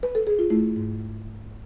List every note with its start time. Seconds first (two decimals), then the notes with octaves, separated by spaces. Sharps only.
0.03 B4
0.15 A4
0.27 G#4
0.39 F4
0.50 A3 E4
0.76 G#2